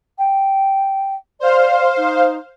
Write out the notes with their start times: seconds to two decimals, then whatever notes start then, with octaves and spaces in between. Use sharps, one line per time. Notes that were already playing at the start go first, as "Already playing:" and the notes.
0.18 G5
1.40 C5 D5 F5
1.97 D#4